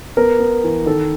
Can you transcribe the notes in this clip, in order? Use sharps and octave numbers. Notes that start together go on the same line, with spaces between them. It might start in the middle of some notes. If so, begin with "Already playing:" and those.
B3 A#4
B3
E3
D#3 A4